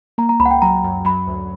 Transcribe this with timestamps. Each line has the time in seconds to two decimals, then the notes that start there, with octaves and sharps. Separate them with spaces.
0.18 A#3 A#5
0.29 A#5
0.40 C#2 B5
0.45 F#5
0.51 G5
0.62 F#3 A#5
0.84 F#2
1.05 F#3 B5
1.27 D2